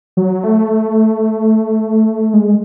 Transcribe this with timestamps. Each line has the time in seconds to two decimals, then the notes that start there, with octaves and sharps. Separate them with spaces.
0.17 F#3
0.44 A3
2.34 G#3